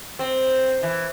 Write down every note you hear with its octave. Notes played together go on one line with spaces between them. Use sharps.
C4
E3